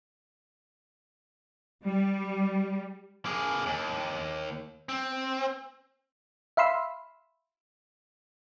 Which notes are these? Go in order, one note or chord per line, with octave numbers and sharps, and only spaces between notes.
G3
A#3 G#4
D#2
C4
E5 F5 B5 C6 E6